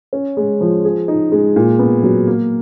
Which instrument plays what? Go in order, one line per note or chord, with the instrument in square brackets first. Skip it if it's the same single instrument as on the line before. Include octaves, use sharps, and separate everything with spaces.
[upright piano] C#4
G#3
F3
G#4
D#4
G#3
A#2
B3
F#3
A#3